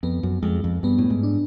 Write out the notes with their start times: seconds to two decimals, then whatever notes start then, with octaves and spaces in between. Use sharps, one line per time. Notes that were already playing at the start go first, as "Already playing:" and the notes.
0.03 F2 B3
0.23 F#2
0.43 F2 G#3
0.64 F2
0.83 G2 B3
0.98 A2
1.10 G#2
1.23 D4